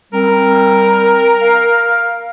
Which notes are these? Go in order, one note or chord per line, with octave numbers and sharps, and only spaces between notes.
G3 C4 A#4
F5